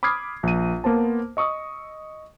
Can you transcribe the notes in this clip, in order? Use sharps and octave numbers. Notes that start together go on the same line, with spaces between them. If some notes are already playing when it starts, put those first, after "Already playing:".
B5 D6 D#6 F6 G#6 C7
A#1 D#7
A#3 B3 C5 A5
D#5 C#6 D#6 E6